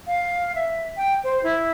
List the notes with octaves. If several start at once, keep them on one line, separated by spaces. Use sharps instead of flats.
F5
E5
G5
C5
E4